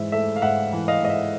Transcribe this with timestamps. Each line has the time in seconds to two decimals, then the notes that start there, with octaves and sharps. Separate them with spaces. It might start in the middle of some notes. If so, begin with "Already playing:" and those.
Already playing: G#2 E3 E5
0.12 A3 E5
0.36 F5
0.42 G#2 E5 F#5
0.73 E3
0.88 D#5 F5
1.02 G#2 D#5
1.10 E5